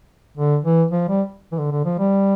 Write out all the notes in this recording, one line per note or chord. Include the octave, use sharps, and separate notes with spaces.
D3
E3
F3
G3
E3
D3
D3
F3
G3